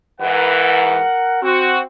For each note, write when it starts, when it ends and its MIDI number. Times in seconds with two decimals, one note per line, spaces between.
0.21 1.00 44
0.21 1.00 52
0.21 1.39 70
0.21 1.00 71
0.21 1.39 78
1.42 1.83 60
1.42 1.79 66